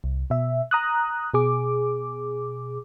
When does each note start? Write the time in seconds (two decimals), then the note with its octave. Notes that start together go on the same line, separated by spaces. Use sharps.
0.04 C2
0.30 B2 E5
0.71 A#5 D#6 F#6
1.34 B2 G#4 D6